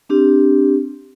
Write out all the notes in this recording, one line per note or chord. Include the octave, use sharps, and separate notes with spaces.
C4 D4 G4